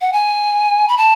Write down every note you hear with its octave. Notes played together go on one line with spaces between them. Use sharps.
F#5
G#5
B5
A5